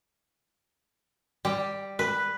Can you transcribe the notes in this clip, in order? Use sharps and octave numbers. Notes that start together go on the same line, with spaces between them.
G3
B4